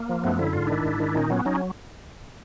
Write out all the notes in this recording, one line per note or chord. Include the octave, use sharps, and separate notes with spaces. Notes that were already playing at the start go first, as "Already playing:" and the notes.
Already playing: A#3
F3
F#2 A3 B3
D3 E4
G#2 F4
D#3 D4 E4
G#2
D#3
A#2 C#4 D#4
F#3 B3 C#4
F#3 C#4 D#4